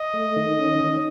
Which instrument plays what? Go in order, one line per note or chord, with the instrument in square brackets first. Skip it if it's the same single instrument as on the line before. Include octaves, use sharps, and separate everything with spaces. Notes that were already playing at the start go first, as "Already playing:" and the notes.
Already playing: [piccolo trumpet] D#5
[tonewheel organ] A3
D#3
C#4
D#3